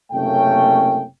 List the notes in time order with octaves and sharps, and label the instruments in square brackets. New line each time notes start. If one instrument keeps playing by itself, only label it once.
[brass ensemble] F#1 C3 A3 A#3 C#4 G5